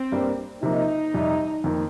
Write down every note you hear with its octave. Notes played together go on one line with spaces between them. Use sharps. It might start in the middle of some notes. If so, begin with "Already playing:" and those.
Already playing: C4
G2 G3 A#3
C3 F3 A#3 D#4
F2 C3 G3
F2 D#3 A#3